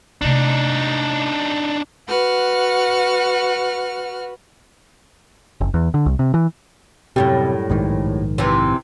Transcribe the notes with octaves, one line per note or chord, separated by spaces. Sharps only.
C3 A3 D4 D#4
F#4 B4 F#5 F6
F#1
E2
D3
C2
C3
E3
F#2 A2 C3 G3
A#1 G#2 D#3
C3 E3